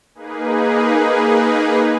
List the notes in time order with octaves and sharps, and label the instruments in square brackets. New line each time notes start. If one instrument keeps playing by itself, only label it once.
[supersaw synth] A#3 D#4 G#4 B4